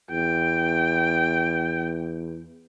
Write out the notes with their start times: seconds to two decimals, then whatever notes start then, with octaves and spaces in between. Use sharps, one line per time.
0.11 E2 G5